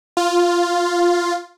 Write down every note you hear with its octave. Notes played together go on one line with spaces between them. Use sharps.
F4